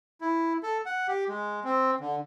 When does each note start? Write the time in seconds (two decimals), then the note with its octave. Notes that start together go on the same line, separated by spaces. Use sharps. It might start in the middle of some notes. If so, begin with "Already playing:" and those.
0.21 E4
0.63 A4
0.86 F#5
1.08 G4
1.29 G#3
1.64 C4
2.00 D3